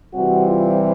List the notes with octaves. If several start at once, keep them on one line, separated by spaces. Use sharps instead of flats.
C3 E3 G3 C4 F#4
F4